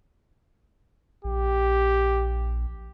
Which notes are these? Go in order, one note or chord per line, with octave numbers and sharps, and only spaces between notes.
A#1 G4